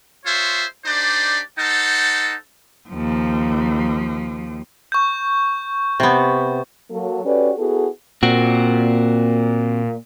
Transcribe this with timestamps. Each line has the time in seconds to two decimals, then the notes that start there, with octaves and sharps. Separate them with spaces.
0.25 F4 G#4 C5 C#5 E5
0.85 D4 D#4 G4 C5 D5
1.59 D#4 A4 C5 F#5 A5
2.89 D#2 F3
4.92 C#6 G6
6.00 C3 B3
6.90 F#3 A#3 A4
7.25 C#4 F#4 G4 A4 B4 D5
7.58 B3 E4 F#4 G#4 A4
8.23 A#2 C4 F#4